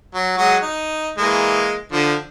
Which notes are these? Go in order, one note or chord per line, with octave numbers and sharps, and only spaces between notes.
F#3
F#3 G#3 F#5
D#4
E3 G#3 A#3
D3 F3